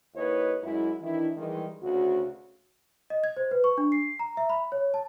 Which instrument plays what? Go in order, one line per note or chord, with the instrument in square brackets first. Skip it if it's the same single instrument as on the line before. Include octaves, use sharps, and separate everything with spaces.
[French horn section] D#2 E4 B4 C#5 D#5
F#2 G#3 E4
D#3 E3 D4 E4
D#3 E3 G3 G#3
D2 C#3 F#4
[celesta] D#5
G#6
C5
B4
C#6
D4
C7
A#5
E5
B5
C#5
A5